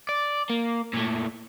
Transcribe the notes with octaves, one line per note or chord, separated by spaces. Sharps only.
D5
A#3
A#2 A3